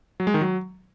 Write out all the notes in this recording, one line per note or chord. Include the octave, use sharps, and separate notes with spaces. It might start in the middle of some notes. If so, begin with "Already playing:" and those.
F#3
G#3
D#3
F#3